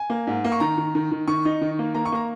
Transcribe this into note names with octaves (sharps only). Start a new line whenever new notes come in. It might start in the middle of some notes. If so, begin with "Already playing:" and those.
Already playing: G#5
A#3
G#2
A#3
C#6
D#3 A#5
D#3
D#3
D#3
D#3 C#6
D#4
D#3
A#3
A#3 A#5
C#6
A#3 A#5